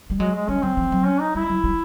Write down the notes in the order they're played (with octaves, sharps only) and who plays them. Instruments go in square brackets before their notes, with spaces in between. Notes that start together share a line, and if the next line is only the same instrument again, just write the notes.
[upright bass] G3
[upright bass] F#3 [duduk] G#3
[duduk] G#3
[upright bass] G3 [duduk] C#4
[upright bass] F#3 [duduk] C4
[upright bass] F3
F#3
[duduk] C#4
D#4
[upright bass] G3 [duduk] E4
[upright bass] F#3
G3